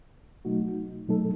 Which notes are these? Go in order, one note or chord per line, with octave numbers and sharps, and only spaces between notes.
B2 F#3 A3 D#4 F#4
B2 F#3 A3 D#4 A4